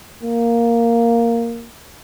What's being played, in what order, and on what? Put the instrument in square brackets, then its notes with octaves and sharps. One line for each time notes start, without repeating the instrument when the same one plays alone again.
[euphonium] A#3